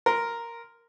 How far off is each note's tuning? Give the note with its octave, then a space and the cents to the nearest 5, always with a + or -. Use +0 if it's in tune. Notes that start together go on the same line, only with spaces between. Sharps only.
A#4 +0 C6 -20